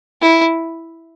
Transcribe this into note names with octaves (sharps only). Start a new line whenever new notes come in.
E4